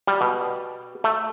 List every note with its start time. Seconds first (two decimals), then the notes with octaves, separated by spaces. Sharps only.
0.07 G3
0.21 B2
1.04 A3